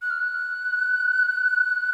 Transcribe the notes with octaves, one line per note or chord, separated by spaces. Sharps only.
F#6
F6
F#6